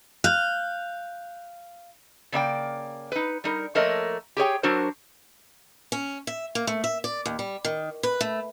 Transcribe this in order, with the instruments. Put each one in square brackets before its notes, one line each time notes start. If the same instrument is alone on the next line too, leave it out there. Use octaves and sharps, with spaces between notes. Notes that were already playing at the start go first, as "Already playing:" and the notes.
[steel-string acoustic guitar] F5 [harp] F#6 G6
[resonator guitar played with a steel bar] C#3 A#3 D5 G5
D#4 B4
G3 D#4 A#4
F3 A3 A#3 A#4 C#5 D#5
G4 G#4 C#5 G5
F#3 D4 F#4 A#4 C5
[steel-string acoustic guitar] C#4
E5
A#3
A3
E5
D5
D#2
G3
D#3
B4
A3